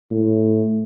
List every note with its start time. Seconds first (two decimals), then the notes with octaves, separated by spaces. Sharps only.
0.11 A2